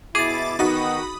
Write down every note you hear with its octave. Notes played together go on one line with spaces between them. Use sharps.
B2 E4 G#4 D6 A6
D#3 B3 D#4 F#4 B5 D#6